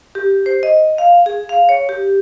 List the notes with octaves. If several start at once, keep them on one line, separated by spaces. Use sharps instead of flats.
G4
C5
D#5
F5
G#4
F5
C#5
G4